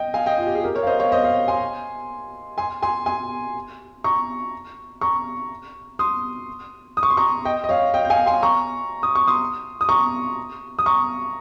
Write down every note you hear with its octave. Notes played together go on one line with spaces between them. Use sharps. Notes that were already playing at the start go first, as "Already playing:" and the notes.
Already playing: D#5 G5
F5 G#5
D#5 G5
F4
G4
G#4
G4 A#4
A#4 C#5
F5
C5 D#5
C#5 F5
C5 D#5
C#5 F5
G#5 C6
G#5 C6
G#5 C6
G#5 C6
A#5 C#6
A#5 C#6
C6 D#6
D#6
C#6
C6
A#5 C#6
D#5 G5
D#5
C#5 F5
D#5 G5
G5
F5 G#5
G#5 C6
A#5 C#6
D#6
C#6
C6 D#6
D#6
A#5 C#6
D#6
A#5 C#6